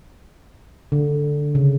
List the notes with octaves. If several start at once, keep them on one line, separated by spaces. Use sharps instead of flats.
D3
C#3